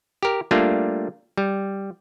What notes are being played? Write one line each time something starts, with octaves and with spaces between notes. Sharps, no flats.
G4 A#4
G3 A3 A#3 D4 F4
G3